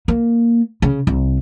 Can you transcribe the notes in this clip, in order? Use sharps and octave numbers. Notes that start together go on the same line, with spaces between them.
A#3
C#3
C2